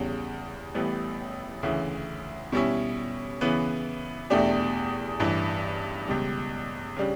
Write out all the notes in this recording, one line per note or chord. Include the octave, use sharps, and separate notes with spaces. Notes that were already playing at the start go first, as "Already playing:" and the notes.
Already playing: E2 C#3 G3
A1 A2 E3 G3 B3
D2 C#3 E3
B2 G3 C#4 E4
C#3 E3 B3
E2 B2 A3 D4 G4
A1 G2 E3
C#2 B2 G3
C#3 G3 D4